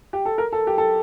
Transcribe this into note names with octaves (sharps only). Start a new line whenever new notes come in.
G4
A4
A#4
A4
G4
A4